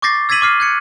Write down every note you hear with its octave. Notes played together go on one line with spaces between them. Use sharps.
C#6 D6 G6 A6 A#6 C7
A6
E6 G#6 A6 B6 D#7 F#7
C#6 D6 F6 C7
F#6 G#6 C#7